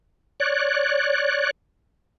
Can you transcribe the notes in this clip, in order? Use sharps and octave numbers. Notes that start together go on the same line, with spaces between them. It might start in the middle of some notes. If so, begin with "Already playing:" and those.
C#5 D5 F#6